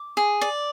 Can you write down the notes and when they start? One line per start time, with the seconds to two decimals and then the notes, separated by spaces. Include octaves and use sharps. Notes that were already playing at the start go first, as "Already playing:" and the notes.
Already playing: D6
0.17 G#4
0.41 D5